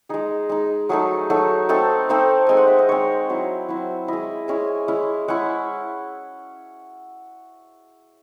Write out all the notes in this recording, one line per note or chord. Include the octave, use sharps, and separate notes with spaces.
G#3 D#4 G#4
G#3 D#4
F#3 A3 D#4 G#4
F#3 A3 D#4
A3 C4 D#4 A4
A3 C4 D#4 C5
G#3 C4 D#4 G#5
F#5
E5
D#5
G#3 C4 D#4 C#5
F#3 C4 E4
F#3 C4 E4
G#3 C#4 E4 D#5
G#3 C#4 E4 G#5
G#3 C#4 E4
G#3 C#4 E4 F#5